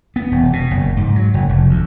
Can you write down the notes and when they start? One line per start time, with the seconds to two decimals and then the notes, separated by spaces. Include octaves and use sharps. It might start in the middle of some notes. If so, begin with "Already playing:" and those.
0.16 B3
0.32 E1
0.53 B2
0.71 F#1
0.97 G#2
1.16 F#3
1.34 F#1
1.49 F1
1.69 D2